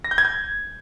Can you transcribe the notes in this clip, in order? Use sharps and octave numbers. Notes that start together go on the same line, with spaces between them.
A#6
G6
G#6
G6